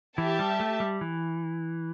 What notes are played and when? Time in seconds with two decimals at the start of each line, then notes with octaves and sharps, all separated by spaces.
0.18 E3 G4 E5 A5
0.39 G3
0.60 A3
0.80 G3
1.01 E3